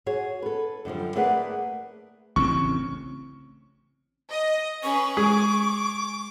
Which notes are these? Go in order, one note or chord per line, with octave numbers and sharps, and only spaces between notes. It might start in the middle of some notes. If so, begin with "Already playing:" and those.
F#4 G#4 C#5
A4 B4
F#2 D3 F3 G3
A3 A#3 G#4 B4 D5 F#5
A1 C#3 C4 C#6
D#5
C#4 G#4 B4 C#6
G#3 G#4 D6